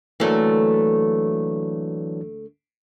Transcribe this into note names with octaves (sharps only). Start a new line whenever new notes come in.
D2 E3 F#3 A3 A#3 D4